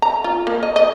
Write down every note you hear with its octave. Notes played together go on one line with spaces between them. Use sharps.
A#5
F4
A#3
D#5
D#5